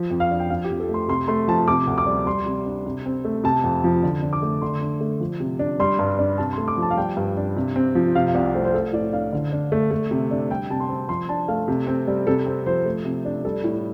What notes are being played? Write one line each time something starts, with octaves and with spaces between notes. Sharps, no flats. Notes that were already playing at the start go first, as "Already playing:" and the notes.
Already playing: F3
F2
F5
D4
G5
F3 F5
G4
F2
A4
A3
C6
C3 C6
A3 C6
F3 A5
C3 D6
D2
D6
G3
G3 C6
C3
D4
C3
C4
A3
C3 A5
F2
F3
D3
D4
D6
A3
D3 C6
D4
A3
F3
C3
D4
G3 C6
G2
D4
C3 A5
C6
A3
D6
F3
A5
F5
G3 G5
G2
D4
C3
C4
F3
C3 F5
F5
C2 D5
A3 C5
C5
A3 A4
A2 D5
D4 F5
D3
D4
A3
A3
C3
D4
G3 G5
C3 A5
C6
C4
F3 C6
D4 A5
A3 F5
C3
C4
G3
C3 A4
C4
F3 C5
A3
C3
D4
G3 A4
A2